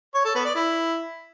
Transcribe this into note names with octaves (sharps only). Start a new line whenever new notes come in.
C#5
A4
B3
D5
E4